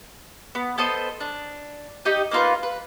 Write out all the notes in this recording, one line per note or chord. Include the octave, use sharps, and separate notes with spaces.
B3
B3 A4 C5 D#5
D4
D#4 G4 D#5
A#3 D#4 F4 B4
B4